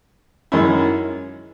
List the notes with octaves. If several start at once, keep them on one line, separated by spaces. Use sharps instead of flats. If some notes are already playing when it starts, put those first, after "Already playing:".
F#2 D#3 G#3 C#4 E4